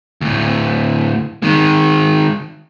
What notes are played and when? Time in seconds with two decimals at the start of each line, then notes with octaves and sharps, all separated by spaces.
0.21 D2 A2
1.42 D#3 G#3